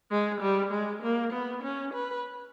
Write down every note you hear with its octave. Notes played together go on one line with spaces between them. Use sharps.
G#3
G3
G#3
A#3
B3
C#4
B4